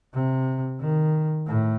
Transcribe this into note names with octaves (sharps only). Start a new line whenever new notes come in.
C3
D#3
A2